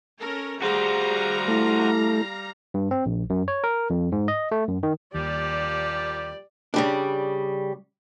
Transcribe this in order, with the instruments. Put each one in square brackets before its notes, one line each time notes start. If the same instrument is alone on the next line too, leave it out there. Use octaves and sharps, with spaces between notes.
[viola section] C#4 A4 A#4
[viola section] G3 F5 A#5 [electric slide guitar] F#4 C5 [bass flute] G#4
[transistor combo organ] A3 [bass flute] E4
[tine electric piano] G2
C4
A#1
F#2
C#5
A#4
F2
G#2
D#5
A3
F#2
D#3
[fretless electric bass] D#2 [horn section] A#2 F3 G3 [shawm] G4 [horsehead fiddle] D5
[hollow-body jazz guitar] C#3 G3 D4